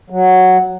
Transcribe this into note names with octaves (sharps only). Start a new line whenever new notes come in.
F#3